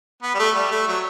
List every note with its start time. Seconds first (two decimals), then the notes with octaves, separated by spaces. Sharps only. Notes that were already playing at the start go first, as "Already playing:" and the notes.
0.23 B3
0.34 G3
0.39 A3
0.55 G3
0.71 A3
0.88 F#3